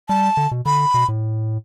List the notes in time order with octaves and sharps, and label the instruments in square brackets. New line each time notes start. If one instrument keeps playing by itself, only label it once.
[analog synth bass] G3 [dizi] A5
[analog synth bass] D3
B2
[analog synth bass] D3 [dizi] B5
[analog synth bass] B2
A2